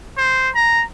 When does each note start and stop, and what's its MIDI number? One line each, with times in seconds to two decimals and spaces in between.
0.18 0.49 72
0.55 0.83 82